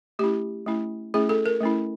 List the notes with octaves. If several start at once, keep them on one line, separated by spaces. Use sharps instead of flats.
A3 C#4 E4 G4
A3 C#4 E4
A3 C#4 E4 G#4
A4
A#4
A3 C#4 E4